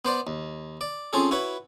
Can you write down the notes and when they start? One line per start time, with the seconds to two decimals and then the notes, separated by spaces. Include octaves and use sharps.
0.05 B3 C5 D5
0.27 D#2
0.81 D5
1.13 F3 C4 C#4 G#4 A4
1.31 E4 F#4 B4 C#5